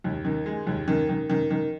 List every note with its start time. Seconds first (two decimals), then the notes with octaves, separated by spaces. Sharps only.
0.04 D#2
0.25 D#3
0.46 G#3
0.67 D#2
0.88 D#3
1.09 D#3
1.30 D#3
1.50 D#3